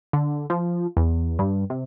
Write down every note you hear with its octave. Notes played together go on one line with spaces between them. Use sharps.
D3
F3
E2
G2
C3